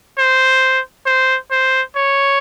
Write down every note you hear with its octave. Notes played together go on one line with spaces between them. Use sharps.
C5
C5
C5
C#5